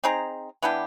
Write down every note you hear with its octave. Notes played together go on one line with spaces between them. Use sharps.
C4 D#4 G#4 A#5
E3 B3 D4 G4